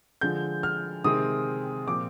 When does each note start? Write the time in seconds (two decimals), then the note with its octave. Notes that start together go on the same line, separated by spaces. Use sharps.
0.21 D3 F3 G#3 G6
0.63 F6
1.04 C3 D#3 G#3 C4 D#6
1.87 A#2 F3 C4 D6